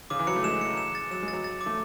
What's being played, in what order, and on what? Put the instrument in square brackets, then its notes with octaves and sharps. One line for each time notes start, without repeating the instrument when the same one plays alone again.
[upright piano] C#3 [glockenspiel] D6
[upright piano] E3
[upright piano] F#3 [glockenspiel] C#7
[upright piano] A3
[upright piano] G#3 [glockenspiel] E7
[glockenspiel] C#7
E7
A6
[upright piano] F#3 [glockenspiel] E7
[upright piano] G#3
[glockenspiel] A6
[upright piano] F#3
[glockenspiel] A6
D6
[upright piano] A3